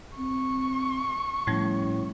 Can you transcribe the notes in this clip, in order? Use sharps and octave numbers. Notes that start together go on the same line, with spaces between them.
C4 C#6
A2 F3 G3 A3 C#4